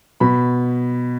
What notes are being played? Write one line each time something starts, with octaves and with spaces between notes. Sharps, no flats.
B2 B5